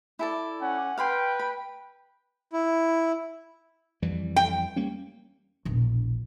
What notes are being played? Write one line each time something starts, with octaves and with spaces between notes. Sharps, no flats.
E4 A4 D5
C#4 F#5
B4 F5 G5 B5 C6
B5
E4
F2 E3 G3
G5
G3 A#3 C#4
E1 A#1